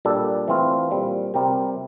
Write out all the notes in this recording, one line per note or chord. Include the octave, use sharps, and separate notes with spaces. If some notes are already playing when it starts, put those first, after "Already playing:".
A#2 G3 D4 A4
E3 A3 C4 F4
A#2 G3 C4
C3 G3 C4 G4 A#4